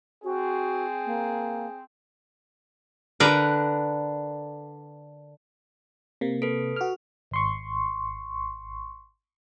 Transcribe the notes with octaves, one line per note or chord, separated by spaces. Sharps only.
C4 F#4 G#4
A#3
D3 D4 A#4 B4 A#5
C3 A#3
A4 B4
F#4 F6
G#1 C6 C#6